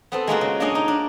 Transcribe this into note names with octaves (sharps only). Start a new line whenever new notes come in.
B3 C4 A4
G#3 A#3 F4 F#4
C#3
A#3 D4 C#5 D#5 F5 G#5
D#4
D4